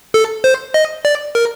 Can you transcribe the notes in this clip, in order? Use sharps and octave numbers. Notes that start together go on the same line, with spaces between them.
A4
C5
D#5
D5
A#4